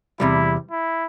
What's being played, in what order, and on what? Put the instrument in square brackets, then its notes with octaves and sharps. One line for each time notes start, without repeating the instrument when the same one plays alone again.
[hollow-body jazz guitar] E2 C3 G3 [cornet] E4
[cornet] E4